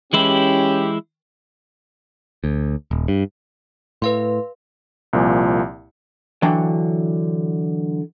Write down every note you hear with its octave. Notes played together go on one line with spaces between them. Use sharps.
E3 G#3 C#4 E4 G4
D2
D#1
G2
A2 B4 F5 C6
C2 A#2 F3 G#5
D3 E3 F#3 D4 G5